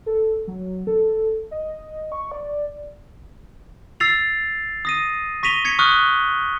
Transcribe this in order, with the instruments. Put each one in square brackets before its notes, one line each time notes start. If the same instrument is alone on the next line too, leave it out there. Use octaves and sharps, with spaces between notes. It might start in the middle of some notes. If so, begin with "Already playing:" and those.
[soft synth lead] A4
F#3
A4
D#5
C#6
D5
[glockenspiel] E6 A6 C7 F7
D#6 A#6 D#7
C#6 A#6 B6 D#7 F7 G7
G#6 B6 C#7 F7
C#6 D#6 F6 F#6 G7